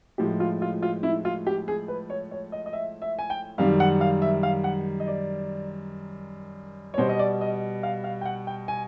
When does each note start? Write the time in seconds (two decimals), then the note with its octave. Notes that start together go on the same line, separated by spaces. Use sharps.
0.18 A2 F3 G#3 G4
0.40 F4
0.62 F4
0.82 F4
1.03 E4
1.25 F4
1.47 G4
1.68 G#4
1.88 B4
2.10 C#5
2.31 C#5
2.52 D#5
2.66 D#5
2.73 E5
3.02 E5
3.19 G#5
3.30 G5
3.58 F#2 D#3 G3 F5
3.80 F#5
4.01 F5
4.22 E5
4.43 F5
4.64 F#5
5.00 D#5
5.07 D5
6.94 C#5
6.98 B2 G3 C5
7.09 D#5
7.19 D5
7.41 D#5
7.83 F5
8.04 F5
8.21 G5
8.25 F#5
8.47 G5
8.68 G#5